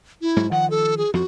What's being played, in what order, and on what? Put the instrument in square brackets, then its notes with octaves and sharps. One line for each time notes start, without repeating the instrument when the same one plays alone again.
[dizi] E4
[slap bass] G#2 F#3
[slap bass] D#3 F3 [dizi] F#5
[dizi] A4
G#4
[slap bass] F2 F3 [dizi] F#4